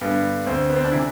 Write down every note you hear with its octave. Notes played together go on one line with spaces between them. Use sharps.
G2 D3 B3
D2 D3 C4
B3
C4
D4
C3 E3 E4